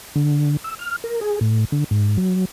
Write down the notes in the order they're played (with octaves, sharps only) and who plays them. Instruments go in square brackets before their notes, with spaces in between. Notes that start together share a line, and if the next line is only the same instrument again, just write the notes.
[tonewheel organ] D3
E6
F6
A#4
G#4
A2
D3
G#2
F#3